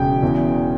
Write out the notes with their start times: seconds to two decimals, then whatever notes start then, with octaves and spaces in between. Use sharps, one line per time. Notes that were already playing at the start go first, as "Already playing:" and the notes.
Already playing: E1 C#3 G5
0.23 E2